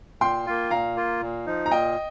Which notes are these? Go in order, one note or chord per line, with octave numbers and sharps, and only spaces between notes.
A#2 G5 C6
A#3 F4
A#2 F5 A#5
A#3 F4
A#2
F3 D#4
A#5
A#2 D#5 G5